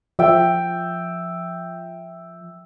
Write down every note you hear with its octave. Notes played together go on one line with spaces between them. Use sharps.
F3 E5 G5